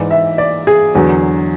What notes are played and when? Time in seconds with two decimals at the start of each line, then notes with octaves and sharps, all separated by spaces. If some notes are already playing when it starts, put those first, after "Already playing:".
Already playing: G#2 E3 D5
0.11 E5
0.38 D5
0.67 G#4
0.95 E2 D3 F#3